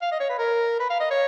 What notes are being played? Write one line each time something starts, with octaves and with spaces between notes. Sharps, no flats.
F5
D#5
C#5
B4
A#4
B4
F5
D#5
C#5